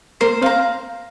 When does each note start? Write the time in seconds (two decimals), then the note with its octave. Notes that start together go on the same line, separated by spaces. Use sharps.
0.21 A#3 A#4 C5
0.41 C4 C5 F5 A#5